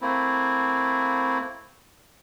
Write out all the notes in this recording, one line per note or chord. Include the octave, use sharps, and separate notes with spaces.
A3 A#3 C4 E4